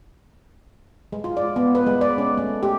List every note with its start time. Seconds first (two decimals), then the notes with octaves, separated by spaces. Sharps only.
1.12 G#3
1.24 F4
1.37 D5
1.56 B3
1.75 B4
1.86 G#3
2.01 D5
2.18 C#4
2.38 A3
2.63 G4